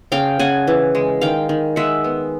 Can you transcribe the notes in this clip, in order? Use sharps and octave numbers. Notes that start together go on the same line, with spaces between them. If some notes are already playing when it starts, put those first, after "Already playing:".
C#3 F5 G5
C#3 F#5 G#5
E3
G#3
D#3 F5 G5
D#3
G#3 E5 F#5
B3